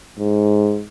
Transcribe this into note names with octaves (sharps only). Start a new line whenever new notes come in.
G#2